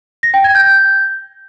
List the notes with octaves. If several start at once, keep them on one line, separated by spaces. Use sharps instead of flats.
A#6
G5
G#6
G6